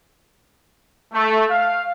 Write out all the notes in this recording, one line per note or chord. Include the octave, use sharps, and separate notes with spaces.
A3
F5